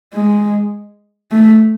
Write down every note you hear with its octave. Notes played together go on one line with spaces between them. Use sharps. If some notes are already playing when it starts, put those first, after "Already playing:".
G#3
A3